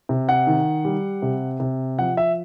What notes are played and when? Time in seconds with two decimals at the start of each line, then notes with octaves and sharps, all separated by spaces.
0.09 C3
0.29 F#5
0.47 D#3
0.85 G3
1.22 C3
1.60 C3
1.98 F3 F#5
2.17 E5